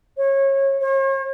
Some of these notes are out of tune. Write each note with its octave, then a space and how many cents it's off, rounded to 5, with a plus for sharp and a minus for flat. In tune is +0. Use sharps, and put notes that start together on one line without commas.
C#5 -25
C#5 -45